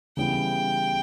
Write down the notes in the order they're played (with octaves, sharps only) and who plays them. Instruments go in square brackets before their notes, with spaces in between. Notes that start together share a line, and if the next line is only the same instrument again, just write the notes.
[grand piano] C#3 E3 G3 B3 E4 [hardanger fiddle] G5